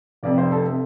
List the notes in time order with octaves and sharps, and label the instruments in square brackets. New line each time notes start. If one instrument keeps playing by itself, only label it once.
[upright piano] F1 F2 C3 D5
C5
A4
C3